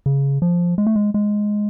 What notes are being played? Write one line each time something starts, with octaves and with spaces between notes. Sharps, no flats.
C#3
F3
G#3
A3
G#3
G#3